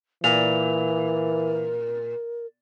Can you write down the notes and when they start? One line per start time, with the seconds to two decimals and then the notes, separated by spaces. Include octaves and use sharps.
0.24 A#2 E3 A#4 F7